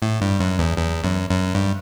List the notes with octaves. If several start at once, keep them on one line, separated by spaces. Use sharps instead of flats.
A2
G2
F#2
E2
E2
F#2
F#2
G2